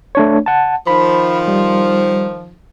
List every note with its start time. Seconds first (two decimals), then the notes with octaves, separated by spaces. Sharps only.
0.15 A3 D4 C#5
0.46 F#5 A5
0.87 D#3 F3 B5
1.48 G3